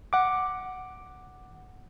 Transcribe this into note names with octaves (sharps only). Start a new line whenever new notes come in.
F#5 D6